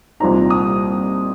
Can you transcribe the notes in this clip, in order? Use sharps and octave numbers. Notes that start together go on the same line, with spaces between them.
C2 A#2 G3 C4 D#4 A#5
D#6